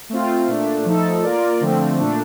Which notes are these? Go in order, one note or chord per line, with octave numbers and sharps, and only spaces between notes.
A3 C4 F4
A#2 A3 D4
F3 A3 D#4 A4
A#3 F4 A#4 D5
D3 F3 A3 C4
A#2 A3 D4